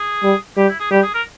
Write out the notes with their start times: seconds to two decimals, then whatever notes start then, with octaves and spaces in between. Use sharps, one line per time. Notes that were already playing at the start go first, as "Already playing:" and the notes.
Already playing: G#4
0.23 G3
0.57 G3 G4
0.69 E4
0.80 G#4
0.91 G3 G4
1.03 G#4
1.14 A#4